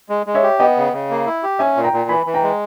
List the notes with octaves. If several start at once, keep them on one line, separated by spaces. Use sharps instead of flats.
G#3
G#3
C#5 E5
G4
B3 D#5 G5
C#3
C#3
A#3
E4
G4
C#4 E5 G#5
A#2
G5 A#5
A#2
E3 G#5 B5
E3
G5 A#5
G#3